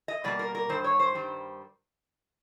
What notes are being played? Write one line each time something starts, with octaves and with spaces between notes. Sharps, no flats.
D#5
B2 G3 A#3 D5
A#4
A#4
G2 D#3 C5
C#5
C5
G2 D#3 G3